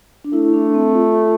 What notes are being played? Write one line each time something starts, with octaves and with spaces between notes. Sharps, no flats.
D4
A3 E4
D4
C4
F4